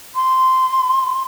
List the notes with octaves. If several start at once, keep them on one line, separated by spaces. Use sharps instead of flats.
C6